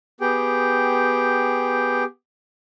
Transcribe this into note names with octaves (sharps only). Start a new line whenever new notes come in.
B3 G4 G#4 G5